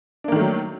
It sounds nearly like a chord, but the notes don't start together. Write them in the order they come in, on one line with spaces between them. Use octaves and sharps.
D4 A#3 D#3 A3 F#3